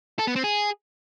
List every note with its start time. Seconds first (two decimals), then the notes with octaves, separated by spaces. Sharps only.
0.19 A4
0.27 B3
0.36 C4
0.44 G#4